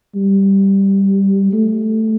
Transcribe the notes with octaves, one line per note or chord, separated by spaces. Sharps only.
G3
A3